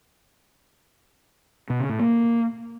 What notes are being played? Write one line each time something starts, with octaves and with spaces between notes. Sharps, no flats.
B2
C#3
A2
A#3